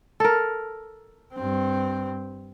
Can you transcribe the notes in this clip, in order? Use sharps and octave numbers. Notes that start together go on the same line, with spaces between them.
A4 A#4
G2 C4